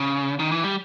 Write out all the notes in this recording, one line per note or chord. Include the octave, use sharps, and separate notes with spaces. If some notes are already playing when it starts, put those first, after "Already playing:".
Already playing: C#3
D#3
E3
G3